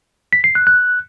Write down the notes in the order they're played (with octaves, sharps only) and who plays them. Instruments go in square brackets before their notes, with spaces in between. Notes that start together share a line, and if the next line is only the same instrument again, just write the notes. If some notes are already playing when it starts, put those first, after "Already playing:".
[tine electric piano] B6
C7
F#6
F#6